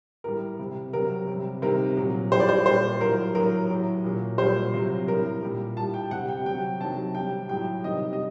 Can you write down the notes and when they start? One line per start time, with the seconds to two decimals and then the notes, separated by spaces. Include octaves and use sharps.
0.24 A2 G3 A#4
0.59 C3 G3
0.93 C3 F#3 A#4
1.28 C3 G3
1.62 C3 D#3 G3 A#4
1.97 A#2 F#3
2.32 A2 G3 C5
2.40 D5
2.49 C5
2.66 A#2 G3 C5
3.00 A2 F#3 A#4
3.35 A2 F#3 A#4
3.70 A2 F#3
4.04 A#2 F#3
4.38 A#2 G3 C5
4.73 C3 F#3
5.08 A2 G3 A#4
5.42 A#2 G3
5.77 A2 G3 A5
5.94 G5
6.11 C3 G3 F#5
6.28 G5
6.46 C3 F#3 G5
6.80 C3 D#3 F#3 A5
7.15 C3 G3 G5
7.49 A2 F#3 G5
7.84 C3 D#3 G3 D#5
8.13 D#5